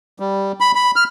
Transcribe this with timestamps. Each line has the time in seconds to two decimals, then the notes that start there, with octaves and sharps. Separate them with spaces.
0.20 G3
0.60 B5
0.75 B5
0.96 F6